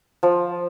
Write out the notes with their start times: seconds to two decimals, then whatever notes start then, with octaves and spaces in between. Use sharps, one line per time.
0.23 F3